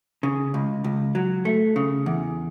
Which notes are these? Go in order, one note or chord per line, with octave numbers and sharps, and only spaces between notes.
C#3
C#2
C#2
F#3
A3
C#3
E2